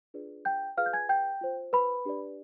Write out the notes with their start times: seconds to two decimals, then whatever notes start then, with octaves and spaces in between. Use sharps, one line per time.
0.14 D4 F4 G#4 B4 D5
0.45 G5 G6
0.77 F4 G#4 B4 D5 F5 F6
0.86 G6
0.93 G#5 G#6
1.09 G5 G6
1.41 F4 C5
1.73 B4 B5
2.05 D4 G4 B4 D5